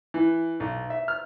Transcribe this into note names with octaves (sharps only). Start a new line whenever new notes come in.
E3
B1
E5
F6